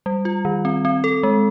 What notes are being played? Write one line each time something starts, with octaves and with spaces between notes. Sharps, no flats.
G3
F4
D#3
C4
C4
A4
G#3